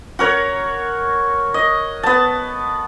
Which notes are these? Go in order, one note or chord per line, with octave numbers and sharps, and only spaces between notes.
F#4 A#4 C#5
D#5
B3 A5